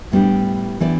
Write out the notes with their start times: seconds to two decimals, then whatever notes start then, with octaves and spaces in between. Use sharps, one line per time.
0.12 A2 G3 B3 D4 G4
0.80 E3 B3 D4 G4 D5